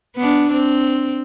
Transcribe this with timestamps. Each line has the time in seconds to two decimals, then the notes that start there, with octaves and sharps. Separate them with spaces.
0.16 B3 D4
0.52 C4